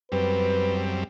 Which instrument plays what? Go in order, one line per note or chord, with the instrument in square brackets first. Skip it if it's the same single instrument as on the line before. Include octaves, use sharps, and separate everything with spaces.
[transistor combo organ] F#2 G3 C4 [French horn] B4